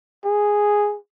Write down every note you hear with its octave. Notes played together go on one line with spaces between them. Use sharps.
G#4